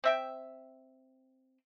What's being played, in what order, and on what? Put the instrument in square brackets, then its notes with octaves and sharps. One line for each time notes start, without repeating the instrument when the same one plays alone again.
[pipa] C4 E5 G5